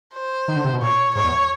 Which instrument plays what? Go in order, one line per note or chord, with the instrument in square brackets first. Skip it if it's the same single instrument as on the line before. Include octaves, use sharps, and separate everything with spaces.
[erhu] C5
[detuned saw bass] D#3
D3
C3
B2
[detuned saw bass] A#2 [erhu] C#5
[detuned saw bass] G#2 [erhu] C#5
[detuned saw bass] E2